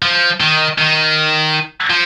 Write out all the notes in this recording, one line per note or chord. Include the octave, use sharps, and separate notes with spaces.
F3
D#3
D#3
F3